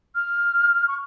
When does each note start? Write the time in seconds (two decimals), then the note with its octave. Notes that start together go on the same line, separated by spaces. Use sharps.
0.15 F6
0.88 C#6